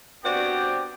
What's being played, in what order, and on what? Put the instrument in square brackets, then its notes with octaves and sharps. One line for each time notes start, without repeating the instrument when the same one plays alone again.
[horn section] B3 C4 D4 F#4 G4 D5